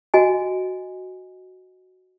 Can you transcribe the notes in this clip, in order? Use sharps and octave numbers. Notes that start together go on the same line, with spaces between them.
F#4 D#5 G#5